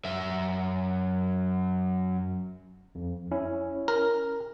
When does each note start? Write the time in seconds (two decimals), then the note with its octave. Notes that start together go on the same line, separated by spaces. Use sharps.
0.05 F#2 E5
2.95 F2
3.31 C#4 E4
3.88 A#4